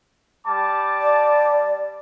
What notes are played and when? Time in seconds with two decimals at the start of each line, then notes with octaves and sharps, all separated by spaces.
0.47 G3 A5 D6
1.01 D5